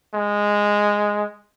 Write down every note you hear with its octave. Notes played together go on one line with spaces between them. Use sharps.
G#3